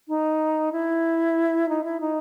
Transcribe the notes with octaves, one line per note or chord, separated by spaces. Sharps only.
D#4
E4
D#4
E4
D#4